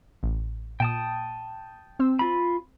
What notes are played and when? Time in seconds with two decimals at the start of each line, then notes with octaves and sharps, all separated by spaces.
0.23 A1
0.80 A#2 G5 A5 D#6
1.99 C4 C5 E6
2.19 F4 B5